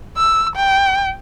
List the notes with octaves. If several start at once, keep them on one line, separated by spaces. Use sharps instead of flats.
E6
G5